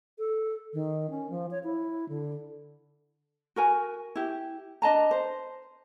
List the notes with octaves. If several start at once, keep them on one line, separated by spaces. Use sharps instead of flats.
A4
D#3
C#4
F3
C#5
E4
D3
F#4 A#4 G#5
E4 G4
D4 D#5 A5 A#5
C5